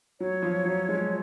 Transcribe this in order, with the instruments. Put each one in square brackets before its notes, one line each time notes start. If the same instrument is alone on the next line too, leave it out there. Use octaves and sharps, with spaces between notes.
[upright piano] F#3 [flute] C#5
[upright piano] F3
F#3
G#3